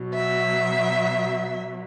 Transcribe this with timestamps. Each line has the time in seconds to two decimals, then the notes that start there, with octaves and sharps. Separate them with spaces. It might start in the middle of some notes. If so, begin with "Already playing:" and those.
Already playing: B2 F#3
0.14 E5